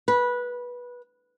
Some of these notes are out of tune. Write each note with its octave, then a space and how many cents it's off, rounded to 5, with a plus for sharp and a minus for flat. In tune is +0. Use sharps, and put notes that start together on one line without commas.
B4 -15